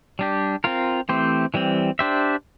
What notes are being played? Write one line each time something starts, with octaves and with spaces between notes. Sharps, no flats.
G3 D4 G4
C4 F4 A#4
E3 A3 C4 G4 C5
E3 G3 C4
D4 G4 C5 E5